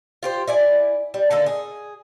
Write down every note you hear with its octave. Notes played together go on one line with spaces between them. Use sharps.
F4 G4 C5
E4 D5 G#5
G3
D3 A#3 D#4 A4
G#4